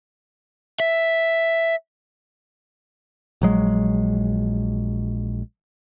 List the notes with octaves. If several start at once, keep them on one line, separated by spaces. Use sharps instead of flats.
E5
A#1 F#3 G#3